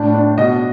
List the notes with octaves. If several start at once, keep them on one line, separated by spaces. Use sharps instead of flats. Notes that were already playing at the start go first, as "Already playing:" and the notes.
Already playing: A2 D4
D4
B2 D#5